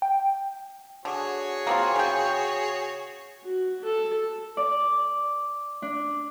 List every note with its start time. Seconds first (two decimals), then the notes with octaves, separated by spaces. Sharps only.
0.02 G5
1.05 D3 F#4 G#4 C#5
1.67 A#3 C4 F4
1.96 C#3 G5
3.45 F#4
3.84 A4
4.57 D5
5.82 D4